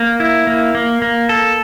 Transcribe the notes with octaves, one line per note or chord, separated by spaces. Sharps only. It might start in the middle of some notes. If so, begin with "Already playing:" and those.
Already playing: A#3
E4
A#3
A#3
A#3
A4